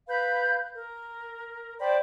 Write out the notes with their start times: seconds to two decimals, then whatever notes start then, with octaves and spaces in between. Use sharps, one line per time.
0.08 B4 F5 B5 G6
0.75 A#4
1.79 C5 D5 G5 B5